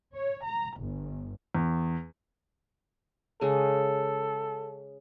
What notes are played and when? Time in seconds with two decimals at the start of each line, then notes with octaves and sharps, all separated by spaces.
0.14 C#5
0.44 A#5
0.80 G1
1.55 E2
3.41 C#3 G#3 A4